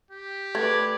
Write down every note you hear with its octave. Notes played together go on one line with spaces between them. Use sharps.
G4
A3 B4 D5 G#6